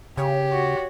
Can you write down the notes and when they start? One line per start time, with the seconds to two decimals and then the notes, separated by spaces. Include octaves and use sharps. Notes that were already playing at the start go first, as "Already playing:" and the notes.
0.17 C#3 G4 C#5
0.52 F#4